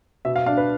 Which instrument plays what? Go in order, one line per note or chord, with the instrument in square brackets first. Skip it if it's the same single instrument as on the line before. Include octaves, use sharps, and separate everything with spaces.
[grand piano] B2 E5
F5
D4 F5
B4